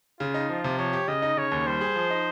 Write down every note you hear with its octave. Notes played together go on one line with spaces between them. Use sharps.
C#3 F4
D#4
F3 F4
C3
F3 C#5
G4
C#3 D#5
D#4
C#3 C#5
D#2
G3 C5
G#4
F3
D#4